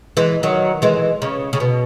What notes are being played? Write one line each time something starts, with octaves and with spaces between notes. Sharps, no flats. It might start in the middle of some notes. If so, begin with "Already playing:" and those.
E3 G#3
D#3 F#3
E3 G#3
C#3
C#3
B2